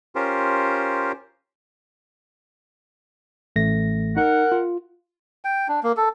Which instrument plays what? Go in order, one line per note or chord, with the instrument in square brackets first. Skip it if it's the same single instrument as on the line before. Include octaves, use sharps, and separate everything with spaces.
[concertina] C#4 F4 G4 A#4 C5
[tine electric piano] A1 A3 A#6
[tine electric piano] D#4 [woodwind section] A#4 F#5
[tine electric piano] F4
[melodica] G5
D4
A#3
A4